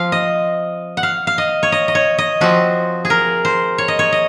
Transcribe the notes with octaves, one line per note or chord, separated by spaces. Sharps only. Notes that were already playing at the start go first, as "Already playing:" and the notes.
Already playing: F3 C4 F5
D#5
F#5
F5
F5
D#5
C#5
D#5
D#5
C#5
D#5
F3 C4 F#4
G#4
A#4
C5
C#5
D#5
C#5
D#5